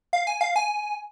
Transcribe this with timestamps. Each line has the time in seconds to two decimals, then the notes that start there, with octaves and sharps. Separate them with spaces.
0.13 F5
0.27 G#5
0.41 F5
0.56 G#5